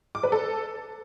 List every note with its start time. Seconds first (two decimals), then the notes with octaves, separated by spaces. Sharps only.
0.15 D6
0.23 B4
0.32 A4